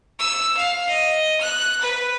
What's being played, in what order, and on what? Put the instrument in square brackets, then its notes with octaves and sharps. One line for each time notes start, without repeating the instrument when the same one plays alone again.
[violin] E6
F5
D#5
F#6
B4